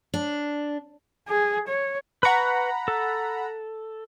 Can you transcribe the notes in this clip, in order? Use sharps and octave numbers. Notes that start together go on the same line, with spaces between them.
D4
G#4
C#5
B4 F#5 A#5 B5 C#6
A4